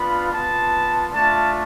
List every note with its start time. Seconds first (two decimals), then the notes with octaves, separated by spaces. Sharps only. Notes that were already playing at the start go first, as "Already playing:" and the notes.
Already playing: B3 D4 F4 B5
0.31 B3 F4 A5
1.12 A3 D4 F4 A5